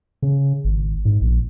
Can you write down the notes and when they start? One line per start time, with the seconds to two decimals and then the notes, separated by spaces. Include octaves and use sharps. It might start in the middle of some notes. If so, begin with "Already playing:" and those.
0.22 C#3
0.64 G#1
1.05 G#2
1.21 A#1